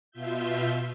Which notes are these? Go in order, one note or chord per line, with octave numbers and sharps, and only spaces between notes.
B2 F4 E5 G6